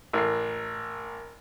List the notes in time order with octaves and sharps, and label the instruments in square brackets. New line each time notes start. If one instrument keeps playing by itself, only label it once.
[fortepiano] A1 [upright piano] A#4 C7